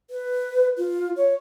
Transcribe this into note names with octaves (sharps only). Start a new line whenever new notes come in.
B4
F4
C#5